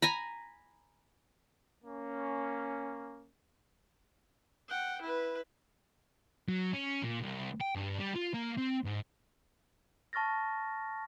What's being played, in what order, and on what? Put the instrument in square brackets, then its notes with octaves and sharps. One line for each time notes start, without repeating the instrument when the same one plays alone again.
[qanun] G#5 A#5 B5
[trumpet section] A#3 C#4
[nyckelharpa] F#5 G5
E4 B4
[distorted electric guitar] F#3
C#4
A#2
C2
G5
G2
G3
F4
A#3
C4
G#2
[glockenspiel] A5 C#6 F6 A6 A#6